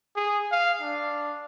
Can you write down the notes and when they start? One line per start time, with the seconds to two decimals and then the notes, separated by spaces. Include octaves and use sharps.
0.16 G#4
0.52 F5
0.81 D4